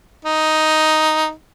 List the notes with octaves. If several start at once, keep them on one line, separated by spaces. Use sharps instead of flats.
D#4